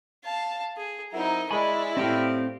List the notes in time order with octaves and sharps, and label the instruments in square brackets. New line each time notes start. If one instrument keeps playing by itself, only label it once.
[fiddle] F5 A5
G#4
[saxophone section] F#3 C4 E4 [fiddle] D#4 A#4
[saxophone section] G#3 [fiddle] E4 D5 [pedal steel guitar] G#5 B5 C#6
[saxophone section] A2 G4 [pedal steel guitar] C4 F5